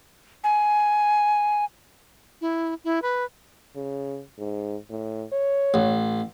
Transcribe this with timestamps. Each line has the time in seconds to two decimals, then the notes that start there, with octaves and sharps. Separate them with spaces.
0.44 G#5
2.41 E4
2.84 E4
3.02 B4
3.75 C#3
4.38 G#2
4.90 A2
5.32 C#5
5.74 A1